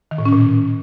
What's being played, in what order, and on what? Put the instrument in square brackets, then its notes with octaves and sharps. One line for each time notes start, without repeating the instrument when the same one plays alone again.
[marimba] D#3
A2
C#4
A#2